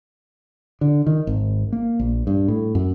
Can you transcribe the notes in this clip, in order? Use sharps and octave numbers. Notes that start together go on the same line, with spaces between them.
D3
D#3
G#1
A#3
A#1
G2
A2
F#2